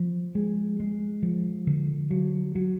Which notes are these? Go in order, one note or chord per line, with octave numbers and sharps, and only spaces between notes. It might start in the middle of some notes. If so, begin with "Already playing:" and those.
Already playing: F3
G#3
G#3
F3
D3
F#3
F#3